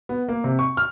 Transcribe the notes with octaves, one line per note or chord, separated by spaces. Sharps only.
B3
A#3
C3
C#6
F6